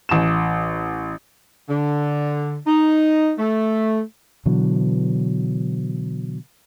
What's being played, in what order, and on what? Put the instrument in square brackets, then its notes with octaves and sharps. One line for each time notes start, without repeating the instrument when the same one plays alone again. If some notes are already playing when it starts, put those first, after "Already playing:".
[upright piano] A1 E7
[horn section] D3
D#4
A3
[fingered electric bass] B2 D3 E3 F#3